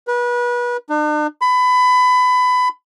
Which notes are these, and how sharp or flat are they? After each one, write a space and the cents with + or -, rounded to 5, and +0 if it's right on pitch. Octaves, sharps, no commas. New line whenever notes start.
B4 -30
D4 +45
B5 +25